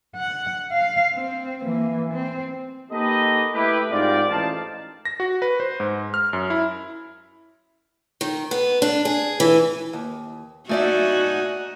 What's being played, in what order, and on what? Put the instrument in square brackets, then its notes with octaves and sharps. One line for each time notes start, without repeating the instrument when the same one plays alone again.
[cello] F#5
F5
C4
E3 A#3
C4
[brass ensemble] A#3 D#4 G4 A4 B4 D#5
A3 E4 G4 B4
G#2 C3 F4 G4 A#4 D5
A1 E3 F3 D#4 F5 A5
[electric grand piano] A#6
F#4
B4
C5
G#2
F6
F#2
E4
[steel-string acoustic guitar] D#3
B3
D4
G#4
E3
D#2
[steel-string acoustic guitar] A3 D5 E5 [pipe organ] D#4 G#5 [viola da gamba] F#4